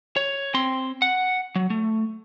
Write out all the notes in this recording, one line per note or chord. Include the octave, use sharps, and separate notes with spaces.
C#5
C4 C6
F#5
F#3
A3